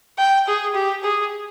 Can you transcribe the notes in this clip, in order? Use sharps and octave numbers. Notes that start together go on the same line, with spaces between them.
G5
G#4
G4
G#4